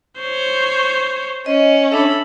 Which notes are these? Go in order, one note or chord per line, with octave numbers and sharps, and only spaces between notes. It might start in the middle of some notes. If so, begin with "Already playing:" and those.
C5 C#5
C#4 D#5
D4 A4 E5 B5